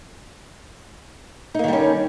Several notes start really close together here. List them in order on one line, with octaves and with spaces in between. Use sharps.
D#4 A#3 D#3 G3 C#4